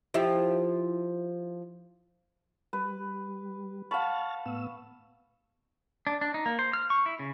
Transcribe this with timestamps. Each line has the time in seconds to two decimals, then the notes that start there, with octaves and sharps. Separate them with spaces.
0.14 F3 E4 G4
2.73 G3 B4
3.91 F5 F#5 A5 B5 C#6 F6 A6
4.46 A2 B3 E6
6.07 D4
6.21 D4
6.34 D#4
6.46 A#3
6.59 C5
6.73 F6
6.90 C#6
7.06 E4
7.19 C#3